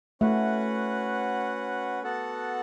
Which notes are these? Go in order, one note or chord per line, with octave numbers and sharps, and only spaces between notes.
A3 C#4 F#4 B4 F#5
B3 F#4 A4 F#5 A5